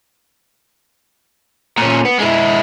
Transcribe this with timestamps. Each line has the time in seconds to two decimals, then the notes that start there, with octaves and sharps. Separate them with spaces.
1.78 A#2 C#4
2.05 B3
2.19 G#3 E4